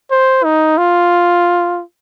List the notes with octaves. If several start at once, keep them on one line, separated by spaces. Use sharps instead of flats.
C5
D#4
F4